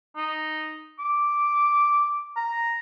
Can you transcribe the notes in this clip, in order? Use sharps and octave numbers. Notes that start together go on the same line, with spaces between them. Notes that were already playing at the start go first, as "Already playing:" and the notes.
D#4
D6
A#5